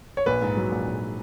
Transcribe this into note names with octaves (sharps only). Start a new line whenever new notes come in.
C#5
A#1 B4
G#2
F#3
A#1
A#1